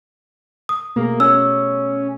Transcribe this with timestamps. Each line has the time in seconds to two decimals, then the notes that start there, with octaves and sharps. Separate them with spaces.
0.69 D#6
0.96 B2 A3 A#3 G#4
1.20 C#4 E6